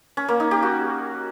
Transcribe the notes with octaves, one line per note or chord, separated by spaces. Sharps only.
C#4
A#3
D#4
G4
F#4